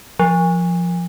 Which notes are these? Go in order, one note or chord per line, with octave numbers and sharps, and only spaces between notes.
F3